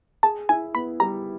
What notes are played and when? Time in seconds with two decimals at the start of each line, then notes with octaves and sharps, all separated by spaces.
0.23 G#4 A5
0.49 E4 G#5
0.75 B3 B5
1.00 G3 A#5